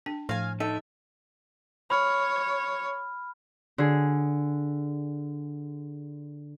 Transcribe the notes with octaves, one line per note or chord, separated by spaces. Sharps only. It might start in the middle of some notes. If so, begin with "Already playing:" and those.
D4 G5
A2 F3 F5 G#5
D#4 A4 E5
C#5 B5 F6
D3 G#4